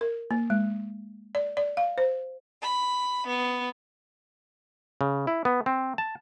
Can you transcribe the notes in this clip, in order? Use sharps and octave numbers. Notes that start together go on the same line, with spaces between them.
A#4
A#3
G#3
D5
D5
F5
C5
B5
B3
C#3
E4
B3
C4
A5